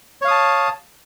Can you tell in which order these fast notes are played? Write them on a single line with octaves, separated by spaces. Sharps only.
C#5 F5 D#6 A5